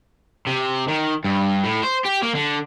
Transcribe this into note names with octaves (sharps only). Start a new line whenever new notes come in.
C3
D#3
G2
A2
C5
G4
A#3
D3